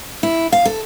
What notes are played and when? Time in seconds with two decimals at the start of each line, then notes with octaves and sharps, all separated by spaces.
0.23 E4
0.52 F5
0.65 A4